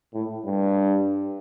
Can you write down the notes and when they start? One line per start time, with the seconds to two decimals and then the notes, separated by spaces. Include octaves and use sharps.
0.14 A2
0.46 G2